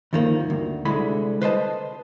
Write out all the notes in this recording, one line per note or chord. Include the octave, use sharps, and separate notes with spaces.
D2 G2 D#3 F3 A#3
D2
C2 D3 G#3 E4 B5
B4 C5 D#5 A5